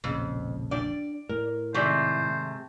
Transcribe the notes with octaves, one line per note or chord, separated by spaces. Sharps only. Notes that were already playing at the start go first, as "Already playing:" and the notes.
E1 A#1 F2 C#3
D4 D5 G5
A2 A#4
G#2 C3 D#3 A3 C5 D5